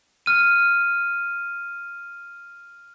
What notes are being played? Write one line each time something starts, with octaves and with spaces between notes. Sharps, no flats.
F6 D#7